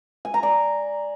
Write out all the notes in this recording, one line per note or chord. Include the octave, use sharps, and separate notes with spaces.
G#5
A#5
D5